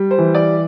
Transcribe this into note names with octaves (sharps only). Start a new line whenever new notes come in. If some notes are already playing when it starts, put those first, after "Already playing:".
Already playing: G3
C5
E3
D5